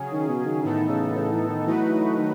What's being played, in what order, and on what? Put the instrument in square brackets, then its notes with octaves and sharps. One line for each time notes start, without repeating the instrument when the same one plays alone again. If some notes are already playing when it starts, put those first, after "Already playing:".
Already playing: [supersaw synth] C#3 F#3 C#4 G#4
[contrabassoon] D#3
B2
D#3
[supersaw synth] A2 E3 B3 D#4 A4 [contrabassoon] D#3
[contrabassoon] C#3
C#3
E3
D#3
[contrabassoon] E3 [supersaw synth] F#3 A3 D#4 F#4 B4
[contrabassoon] D#3